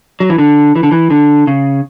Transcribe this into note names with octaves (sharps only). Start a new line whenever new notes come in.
F#3
E3
D3
E3
D3
E3
D3
C#3